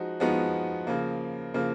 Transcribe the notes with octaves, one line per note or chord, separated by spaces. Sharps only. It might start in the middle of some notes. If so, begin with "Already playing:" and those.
Already playing: F3 G#3 D#4 F#4
F3 G#3 B3 D#4 F#4
C#3 F3 A#3
C#3 F3 A#3